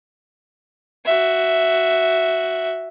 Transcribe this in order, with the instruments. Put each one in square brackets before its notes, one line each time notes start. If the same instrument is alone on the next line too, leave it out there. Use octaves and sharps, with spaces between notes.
[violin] F#4 E5